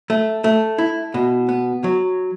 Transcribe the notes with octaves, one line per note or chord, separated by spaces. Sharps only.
A3
A3
E4
B2
B3
F#3